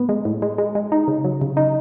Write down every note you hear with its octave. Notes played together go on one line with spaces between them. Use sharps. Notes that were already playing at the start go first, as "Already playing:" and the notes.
Already playing: A2 B3
G#3
A2
G#3
G#3
G#3
D#4
C#3
F#3
C#3
D#4